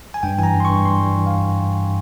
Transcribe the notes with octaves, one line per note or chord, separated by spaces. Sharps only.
G#5
G2 G5
E3 G#5 A#5
G2
C6
G2 C#6
G3 C6
G3
E3
F5